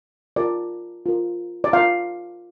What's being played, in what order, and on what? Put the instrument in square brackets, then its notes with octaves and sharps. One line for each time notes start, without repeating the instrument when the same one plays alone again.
[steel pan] F4 A#4 D5
F4 A#4
D5
F4 A#4 F5